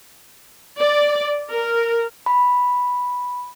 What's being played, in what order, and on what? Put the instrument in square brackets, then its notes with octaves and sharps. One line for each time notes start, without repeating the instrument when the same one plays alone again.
[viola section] D5
A#4
[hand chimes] B5